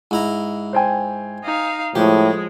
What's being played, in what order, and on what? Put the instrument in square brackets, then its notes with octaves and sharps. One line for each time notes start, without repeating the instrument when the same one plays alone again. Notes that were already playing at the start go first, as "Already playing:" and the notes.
[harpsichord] G#2 E4 A#5
[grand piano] C5 G5 G#5
[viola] D#4 F5
[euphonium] A2 [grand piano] F3 [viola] G#3 [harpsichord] G4